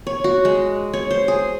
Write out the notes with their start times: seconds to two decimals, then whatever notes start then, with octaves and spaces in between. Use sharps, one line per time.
0.07 C#5
0.24 F#4
0.45 G#3
0.93 C#5
1.10 C5
1.28 G#4